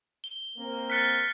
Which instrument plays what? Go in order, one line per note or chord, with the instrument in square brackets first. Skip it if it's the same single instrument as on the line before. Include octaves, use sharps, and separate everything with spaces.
[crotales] G7
[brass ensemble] A#3 C4
[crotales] F6 F#6 A6 [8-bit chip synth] B6 C#7